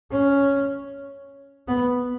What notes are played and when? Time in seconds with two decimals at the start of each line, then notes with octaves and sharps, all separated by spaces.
0.11 C#4
1.68 B3